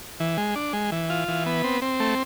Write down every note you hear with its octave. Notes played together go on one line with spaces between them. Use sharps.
E3
G#3
D4
G#3
E3
F4
E3
B3
C4
C4
A3